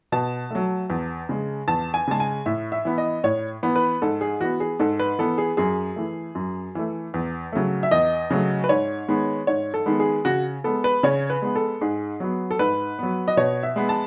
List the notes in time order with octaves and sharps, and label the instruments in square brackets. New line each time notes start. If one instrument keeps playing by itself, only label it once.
[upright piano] B2 A5
F#3 A3
E2
C#3 G#3
E2 A5
G#5
C#3 G#3 A5
G#5
A2 E5
E5
E3 B3
D#5
A2 C#5
E3 B3
B4
G#2 A4
G#4
E3 B3 F#4
G#4
G#2 A4
B4
E3 B3 A4
G#4
F#2 G#4
E3 A3
F#2
E3 A3
E2
C#3 F#3 A3
E5
E2 D#5
C#3 F#3 A3
B4
G#2 C#5
D#3 G#3 B3
G#2 C#5
A4
D#3 G#3 B3
G#4
C#3 F#4
G#3 B3 A4
B4
C#3 C#5
B4
G#3 B3
A4
G#2 G#4
F#3 B3
A4
G#2 B4
F#3 B3
D#5
B2 C#5
E5
G#3 B3
A5